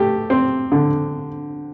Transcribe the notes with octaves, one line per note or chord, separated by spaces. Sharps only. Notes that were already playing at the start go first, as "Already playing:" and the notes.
Already playing: A3 G4
C4
D3